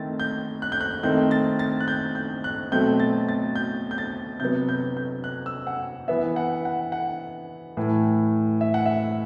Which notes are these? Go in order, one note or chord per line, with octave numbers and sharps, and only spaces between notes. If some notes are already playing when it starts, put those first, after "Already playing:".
Already playing: D#3 A3 C4 A6
G6
F#6
G6
F#6
D#3 A3 C4 G6
A6
A6
F#6
G6
G6
F#6
B2 F#3 A3 C4 G6
A6
A6
G6
G6
A6
C3 F#3 B3 G6
G6
G6
F#6
E6
F#5
E3 B3 E5
F#5
F#5
F#5
A2 E3 A3
E5
F#5
E5